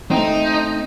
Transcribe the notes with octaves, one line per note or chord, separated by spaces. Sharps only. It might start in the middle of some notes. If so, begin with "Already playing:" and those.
A3 C4 D#4